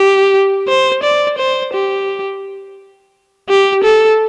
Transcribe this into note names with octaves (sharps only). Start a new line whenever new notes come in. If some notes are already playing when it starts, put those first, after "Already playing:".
Already playing: G4
C5
D5
C5
G4
G4
A4